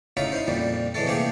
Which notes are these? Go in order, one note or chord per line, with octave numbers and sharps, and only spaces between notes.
A2 C#3 D#4 F4 E5 A#5
D#4 E4 C5
F2 A#2 G3
A2 E3 G#3 A3 A4
C3 A3 A#3 G4 G#4